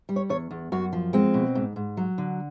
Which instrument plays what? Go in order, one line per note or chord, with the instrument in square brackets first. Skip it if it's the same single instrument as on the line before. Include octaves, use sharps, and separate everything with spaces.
[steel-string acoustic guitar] G3
C#5
E2 C#5
E2
F#2 F#4
F3
G#3 C4
B2
G#2
G#2
F#3
D3